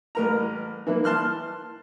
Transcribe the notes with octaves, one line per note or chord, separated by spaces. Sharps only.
A1 A#4 A#5
E3 A#3 E4
A5 C6 F6 F#6